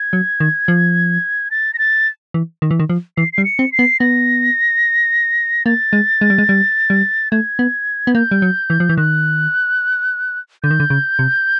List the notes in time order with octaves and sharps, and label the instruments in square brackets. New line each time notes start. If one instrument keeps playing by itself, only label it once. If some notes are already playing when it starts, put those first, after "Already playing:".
Already playing: [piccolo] G#6
[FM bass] F#3
D#3
F3
[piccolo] A6
A#6
A6
[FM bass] E3
D#3
E3
D#3
F3
[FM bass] E3 [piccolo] C7
[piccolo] C7
[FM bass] G3
[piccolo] C#7
[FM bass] C4
[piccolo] C7
[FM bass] B3
[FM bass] B3 [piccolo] A#6
[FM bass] A#3 [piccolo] A6
[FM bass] G#3
G#3
G3
G#3
G3
G3
[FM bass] A3 [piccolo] G#6
[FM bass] B3
B3
[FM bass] A#3 [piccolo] G6
[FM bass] G3
F#3
E3
F3
E3
[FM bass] D#3 [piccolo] F#6
[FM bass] D3 [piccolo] G6
[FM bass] D#3
D3
C#3
C3